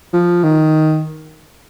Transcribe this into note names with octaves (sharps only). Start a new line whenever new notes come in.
F3
D#3